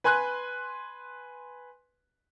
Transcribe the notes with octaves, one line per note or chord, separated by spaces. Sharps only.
B4 G#5 C6 F#6